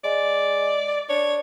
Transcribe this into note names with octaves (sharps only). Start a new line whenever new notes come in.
G#3 D5
D4 C#5